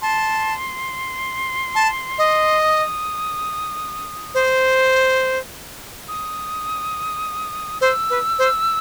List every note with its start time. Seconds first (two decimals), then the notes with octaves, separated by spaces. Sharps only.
0.01 A5 C6
1.75 A5
2.18 D#5
2.61 D#6
4.34 C5
6.08 D#6
7.81 C5 E6
8.10 B4
8.39 C5